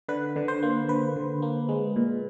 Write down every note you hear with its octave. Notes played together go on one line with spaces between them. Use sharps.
D3 B4
D3
C5
A#3
D3 B4
D3
A#3
G#3
A#2